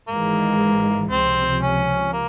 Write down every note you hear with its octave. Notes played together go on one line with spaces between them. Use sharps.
G#1 G#2 E3 G#3 A#3
C#2 C3 F3 C4
C#4
A#3